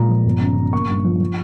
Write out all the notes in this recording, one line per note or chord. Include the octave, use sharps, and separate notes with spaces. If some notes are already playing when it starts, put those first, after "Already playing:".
Already playing: A#2 G#3 A#5
F3
G1
C#3
C#3
A#3 C#6
G2
F3
F3